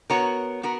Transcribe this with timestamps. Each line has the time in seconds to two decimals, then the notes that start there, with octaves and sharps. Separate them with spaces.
0.10 B3 F#4 A#4 C#5
0.63 B3 F#4 A#4